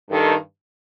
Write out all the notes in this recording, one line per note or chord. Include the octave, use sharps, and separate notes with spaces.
G2 D#3 A4